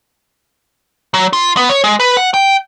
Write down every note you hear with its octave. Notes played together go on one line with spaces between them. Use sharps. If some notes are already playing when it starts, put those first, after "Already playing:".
F#3
F4
B3
C#5
G#3
B4
F#5
G5